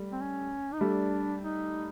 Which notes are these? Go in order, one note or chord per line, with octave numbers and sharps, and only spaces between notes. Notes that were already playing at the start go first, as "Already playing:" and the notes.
Already playing: G3 A3
C4
C#4
D#4
G3 A3 D4
D#4